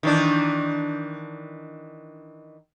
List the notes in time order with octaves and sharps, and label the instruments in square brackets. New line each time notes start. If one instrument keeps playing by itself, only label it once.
[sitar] D#3 E3 D4